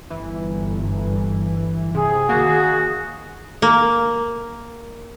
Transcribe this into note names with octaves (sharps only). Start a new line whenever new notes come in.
G1 E3
C3 G#4
D#3 A#3 F#4
A#3